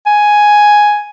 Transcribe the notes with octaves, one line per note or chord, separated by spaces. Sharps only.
G#5